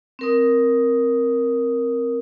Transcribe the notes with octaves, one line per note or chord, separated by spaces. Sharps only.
C4 A#4 D#6